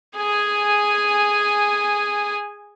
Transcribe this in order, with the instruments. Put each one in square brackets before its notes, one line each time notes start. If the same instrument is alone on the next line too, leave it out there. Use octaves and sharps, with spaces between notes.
[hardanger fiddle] G#4 G#5